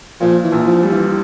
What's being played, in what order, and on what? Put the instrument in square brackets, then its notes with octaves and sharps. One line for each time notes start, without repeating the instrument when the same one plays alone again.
[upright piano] A#2 [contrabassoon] F3
[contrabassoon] E3
[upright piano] A#1
[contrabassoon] F3
[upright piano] G3
[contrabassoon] E3